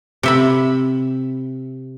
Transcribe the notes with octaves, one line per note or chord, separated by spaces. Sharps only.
C3 E5 B5